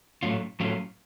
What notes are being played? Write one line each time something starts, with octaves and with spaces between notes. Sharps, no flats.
A2 F#3 A3 C#4 F4
A2 F#3 A3 C#4 F4